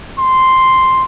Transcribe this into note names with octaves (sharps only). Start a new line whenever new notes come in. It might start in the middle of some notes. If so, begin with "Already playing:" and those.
C6